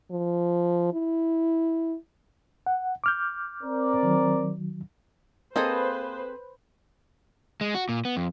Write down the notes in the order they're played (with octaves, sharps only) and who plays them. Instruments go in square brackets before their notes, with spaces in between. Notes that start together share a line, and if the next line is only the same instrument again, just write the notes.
[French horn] F3
E4
[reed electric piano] F#5
D6 F6 G6
[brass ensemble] C4 A#4 D5
[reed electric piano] D#3 F#3
[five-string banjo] A#3 D#5 [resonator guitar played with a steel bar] C4 G#4 A4 [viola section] B4 C5
[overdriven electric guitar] G#3
F#4
A#2
B3
F2